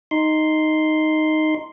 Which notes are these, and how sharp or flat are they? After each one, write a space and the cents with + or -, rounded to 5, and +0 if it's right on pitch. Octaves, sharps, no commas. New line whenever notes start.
D#4 +0 C6 +0